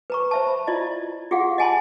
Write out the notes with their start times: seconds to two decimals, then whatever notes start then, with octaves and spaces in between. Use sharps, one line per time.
0.10 B4 A#5 C#6
0.31 C5 E5 A5
0.47 B5
0.67 E4 F4 D5 D#5
1.31 F4 G4 G#4 F5 F#5
1.58 D#5 F#5 G#5 A5 B5 C6